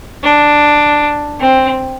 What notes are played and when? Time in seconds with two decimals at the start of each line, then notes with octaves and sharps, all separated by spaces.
0.23 D4
1.40 C4